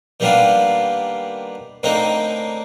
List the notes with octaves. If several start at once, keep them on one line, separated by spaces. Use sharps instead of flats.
D#3 G3 A#3 B3 D4 F4
A2 D3 A#3 C4 D#4